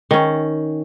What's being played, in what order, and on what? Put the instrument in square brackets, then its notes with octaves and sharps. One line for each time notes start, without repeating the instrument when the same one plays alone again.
[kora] D#3 C#4